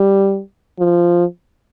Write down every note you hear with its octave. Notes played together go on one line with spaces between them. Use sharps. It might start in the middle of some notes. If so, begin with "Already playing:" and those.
Already playing: G3
F3